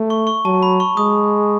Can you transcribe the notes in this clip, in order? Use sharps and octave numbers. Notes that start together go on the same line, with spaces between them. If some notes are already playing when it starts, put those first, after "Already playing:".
Already playing: A3
C#6
C#6
F#3 A5
B5
C#6
G#3 D#6